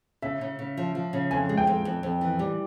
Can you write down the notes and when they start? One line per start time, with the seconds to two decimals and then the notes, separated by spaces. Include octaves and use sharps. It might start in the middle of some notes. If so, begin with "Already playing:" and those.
0.22 C#3 E5
0.41 C#3
0.59 C#3
0.77 F3
0.95 F3
1.13 C#3
1.31 F2 G#5
1.49 G#3
1.57 G5
1.67 F2
1.85 F2
2.03 F2
2.21 E3
2.39 G3